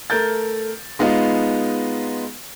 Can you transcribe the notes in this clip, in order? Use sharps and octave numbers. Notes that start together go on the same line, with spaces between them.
A3 A#4 G6 A6
G#3 B3 D#4 F4